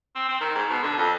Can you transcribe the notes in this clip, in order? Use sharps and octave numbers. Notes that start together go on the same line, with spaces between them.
C4
C4
D#3
G#2
B2
D3
F2